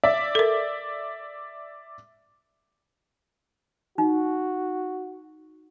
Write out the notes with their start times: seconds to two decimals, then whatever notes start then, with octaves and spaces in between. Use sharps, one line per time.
0.04 D5 E5
0.35 A4 A#4
3.98 D#4 F#4